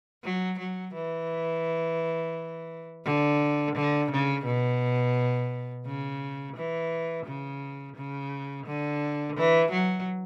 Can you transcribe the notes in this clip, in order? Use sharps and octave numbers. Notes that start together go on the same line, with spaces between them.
F#3
F#3
E3
D3
D3
C#3
B2
C#3
E3
C#3
C#3
D3
E3
F#3